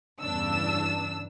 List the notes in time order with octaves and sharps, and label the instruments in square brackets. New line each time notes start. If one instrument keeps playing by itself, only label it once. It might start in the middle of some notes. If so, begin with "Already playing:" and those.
[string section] E2 G2 C#3 D4 E6